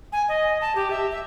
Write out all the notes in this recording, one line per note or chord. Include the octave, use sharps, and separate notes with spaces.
G#5
D#5
A5
G4
E5
E5